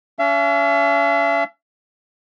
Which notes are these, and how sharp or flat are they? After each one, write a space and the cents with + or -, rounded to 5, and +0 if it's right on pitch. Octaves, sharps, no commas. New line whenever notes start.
C#4 +40 E5 +45